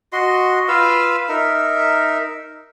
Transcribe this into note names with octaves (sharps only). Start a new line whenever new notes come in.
F#4 D#5 C6
F4 B4 F5 E6
D#4 A#4 E5